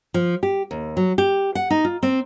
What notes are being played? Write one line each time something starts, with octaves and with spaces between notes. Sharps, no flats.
F3
G4
D#2
F#3
G4
F#5
D#4
F4
C4